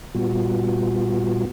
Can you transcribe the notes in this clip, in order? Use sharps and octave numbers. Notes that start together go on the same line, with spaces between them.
A#2 G3 B3 F4 F#4